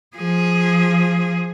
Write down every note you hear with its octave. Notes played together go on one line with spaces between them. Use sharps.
F3 G#4